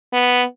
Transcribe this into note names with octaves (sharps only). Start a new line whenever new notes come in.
B3